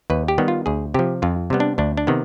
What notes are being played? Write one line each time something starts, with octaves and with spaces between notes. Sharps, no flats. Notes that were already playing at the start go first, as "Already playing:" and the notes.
D#2 B4
G4
D#3 G3 B3
F4
D2 G#4
C3 F3 G4
F2 F4
C3 G3 B3
D4
D2 D4
D4
C3 D#3 B3